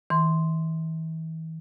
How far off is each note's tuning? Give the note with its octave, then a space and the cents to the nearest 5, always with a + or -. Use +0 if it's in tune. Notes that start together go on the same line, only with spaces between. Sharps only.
E3 -40 C6 -5